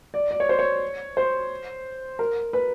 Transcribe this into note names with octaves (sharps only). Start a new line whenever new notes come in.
D5
D5
C#5
C5
C#5
C5
A#4
B4